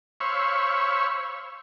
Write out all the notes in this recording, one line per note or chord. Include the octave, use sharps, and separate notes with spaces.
C5 C#5 F5 B5 C#6 E6